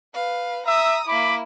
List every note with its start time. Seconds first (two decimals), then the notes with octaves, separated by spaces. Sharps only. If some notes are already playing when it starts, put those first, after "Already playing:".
0.15 B4 F5
0.67 E5 A#5 D#6 E6
1.08 A#3 E4 B5 D6